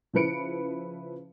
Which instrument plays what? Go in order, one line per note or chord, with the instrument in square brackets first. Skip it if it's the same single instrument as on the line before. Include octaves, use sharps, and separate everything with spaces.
[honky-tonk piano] C#3 F3 E4 B4 C#7 D7